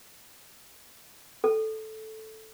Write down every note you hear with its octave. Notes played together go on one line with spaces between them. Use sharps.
A4